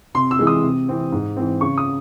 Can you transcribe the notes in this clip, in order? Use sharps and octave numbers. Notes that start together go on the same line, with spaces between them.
C3 C6
E6
E3 G#3
D#6
C3
E3 C4
G#2
E3 C4
C#3 C#6
D#6